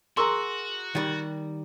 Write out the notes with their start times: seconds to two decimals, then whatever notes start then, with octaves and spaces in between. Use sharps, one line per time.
0.17 F#4 G#4 A#4 A#5 C6 C#6 E6
0.95 D#3 G3